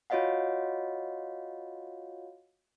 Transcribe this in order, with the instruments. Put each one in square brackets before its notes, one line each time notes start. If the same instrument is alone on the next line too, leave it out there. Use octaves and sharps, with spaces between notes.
[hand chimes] F4 F#4 C#5 D#5 F5 F#5